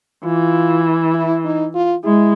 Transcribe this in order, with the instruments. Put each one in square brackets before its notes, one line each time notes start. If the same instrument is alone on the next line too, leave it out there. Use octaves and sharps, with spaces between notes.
[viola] E3 [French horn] F4
[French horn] E4
D#4
F4
[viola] G#3 [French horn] E4